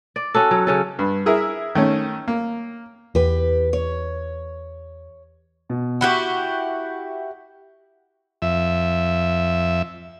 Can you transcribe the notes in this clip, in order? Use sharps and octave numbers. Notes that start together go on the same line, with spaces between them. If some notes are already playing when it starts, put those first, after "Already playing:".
D5
C#4 F#4 A4
F#3
C#3 C#4 A4
G2
E4 G#4 A#4 E5
D#3 A3 C#4
A#3
E2 G4 B4
C#5
B2
E4 F#4 G4 F#5 F#6 G6
F2 E5